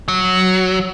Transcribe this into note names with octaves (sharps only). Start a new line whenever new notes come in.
F#3